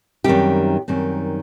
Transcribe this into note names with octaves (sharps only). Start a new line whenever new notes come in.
F#2 D#3 G3 C4 G4
F#2 D#3 G3 C4